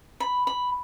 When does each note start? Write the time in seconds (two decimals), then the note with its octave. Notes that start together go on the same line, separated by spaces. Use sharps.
0.20 B5
0.47 B5